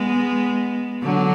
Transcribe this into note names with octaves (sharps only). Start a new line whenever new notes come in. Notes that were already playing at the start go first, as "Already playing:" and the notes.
Already playing: G#3 B3
D3 F#3